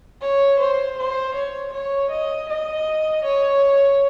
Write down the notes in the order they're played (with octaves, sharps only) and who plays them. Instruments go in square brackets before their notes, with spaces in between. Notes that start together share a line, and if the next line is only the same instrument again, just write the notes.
[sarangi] C#5
C5
C5
C#5
C#5
D#5
D#5
C#5